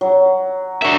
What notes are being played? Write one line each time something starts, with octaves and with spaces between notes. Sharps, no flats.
F#3
D4 F#4 A#4 E5